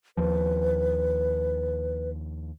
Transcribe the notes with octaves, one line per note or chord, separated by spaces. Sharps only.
D#2 F3 B4